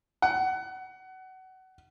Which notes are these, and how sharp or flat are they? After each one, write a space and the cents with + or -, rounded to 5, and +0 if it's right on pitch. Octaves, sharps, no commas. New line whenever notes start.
F#5 +25